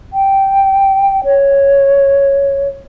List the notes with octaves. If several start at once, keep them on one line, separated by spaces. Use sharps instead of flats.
G5
C#5